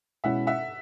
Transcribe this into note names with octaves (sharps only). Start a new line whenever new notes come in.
B2 G#3 C#4 E4 E5 F#5
E5 F#5